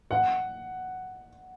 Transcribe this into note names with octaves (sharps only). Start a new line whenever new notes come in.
F#5